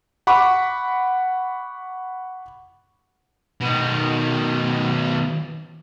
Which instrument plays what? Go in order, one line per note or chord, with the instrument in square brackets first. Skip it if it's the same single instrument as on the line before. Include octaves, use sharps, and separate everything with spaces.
[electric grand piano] F#5 B5 C#6 D6
[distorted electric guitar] B2 D#3